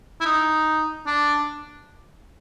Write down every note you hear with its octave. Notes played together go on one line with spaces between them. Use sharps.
E4
D#4
D4